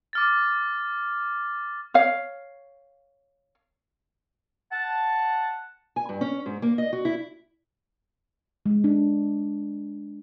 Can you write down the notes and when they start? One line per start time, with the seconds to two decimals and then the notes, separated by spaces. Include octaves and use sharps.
0.13 D6 F6 A6
1.94 C#5 F5
4.72 F#5 A5
5.96 G#5
6.09 G2
6.21 C#4
6.46 G#2
6.62 A#3
6.78 D#5
6.93 F#4
7.05 E4
8.66 G#3
8.84 D4